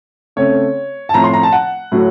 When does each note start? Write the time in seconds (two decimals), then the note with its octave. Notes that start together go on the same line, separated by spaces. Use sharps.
0.36 C#3 A3 C4 C#5
1.09 A5
1.14 A2 F3 C4 A#5
1.24 C6
1.34 A#5
1.43 A5
1.52 F#5
1.92 A2 F#3 A3